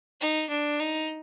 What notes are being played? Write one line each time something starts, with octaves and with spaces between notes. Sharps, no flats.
D#4
D4
D#4